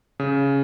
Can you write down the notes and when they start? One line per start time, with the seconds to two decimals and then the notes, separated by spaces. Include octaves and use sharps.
0.20 C#3